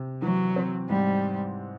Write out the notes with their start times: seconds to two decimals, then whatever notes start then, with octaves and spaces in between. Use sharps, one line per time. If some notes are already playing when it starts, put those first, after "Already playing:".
Already playing: C3
0.22 E3 F#3
0.56 C4
0.89 G#2 G3